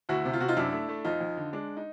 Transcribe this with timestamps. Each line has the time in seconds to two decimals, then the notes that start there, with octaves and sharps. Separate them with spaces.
0.09 D2 E4 F#4
0.25 C3
0.33 F4
0.40 C3 F#4
0.48 D#4 F4
0.56 F#2 D4 E4
0.73 A3
0.89 A3
1.05 F2 D#4 F4
1.21 F2
1.37 D3
1.53 G#3 D4
1.77 D#4